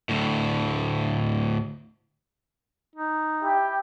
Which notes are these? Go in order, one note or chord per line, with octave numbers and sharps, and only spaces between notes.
D2 A2
D#4
E4 G4